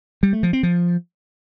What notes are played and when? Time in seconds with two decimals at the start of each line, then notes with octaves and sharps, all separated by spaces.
0.23 G3
0.33 A3
0.43 F3
0.53 C4
0.63 F3